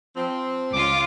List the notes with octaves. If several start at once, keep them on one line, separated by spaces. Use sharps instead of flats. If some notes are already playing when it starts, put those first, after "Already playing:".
F3 C4
C#2 F4 D6